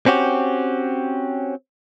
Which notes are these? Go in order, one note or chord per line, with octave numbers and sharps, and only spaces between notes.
C4 C#4 F#4 G4